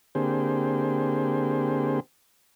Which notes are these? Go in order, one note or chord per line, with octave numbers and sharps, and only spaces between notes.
D3 A#3 C4 G4 G#4 C5